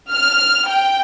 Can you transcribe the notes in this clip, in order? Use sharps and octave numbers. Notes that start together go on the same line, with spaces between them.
F6
G5